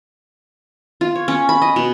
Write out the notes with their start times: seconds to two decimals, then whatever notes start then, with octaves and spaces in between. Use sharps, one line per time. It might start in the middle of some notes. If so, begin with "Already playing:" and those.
1.01 F4
1.16 C#5
1.28 C#4
1.49 B5
1.62 D#5
1.76 B2